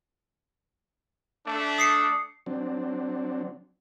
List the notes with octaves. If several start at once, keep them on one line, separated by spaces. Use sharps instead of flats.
A3 D4
D#6 C7 C#7
F#3 C4 D4